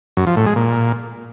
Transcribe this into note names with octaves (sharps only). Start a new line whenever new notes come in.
F#2
F3
A2
G#3
A#2